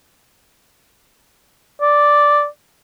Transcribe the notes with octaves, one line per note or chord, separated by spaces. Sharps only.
D5